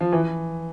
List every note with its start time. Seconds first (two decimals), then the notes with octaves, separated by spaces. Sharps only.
0.01 F3
0.12 E3